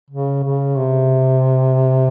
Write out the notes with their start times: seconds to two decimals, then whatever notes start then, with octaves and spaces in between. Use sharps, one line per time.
0.10 C#3
0.43 C#3
0.76 C3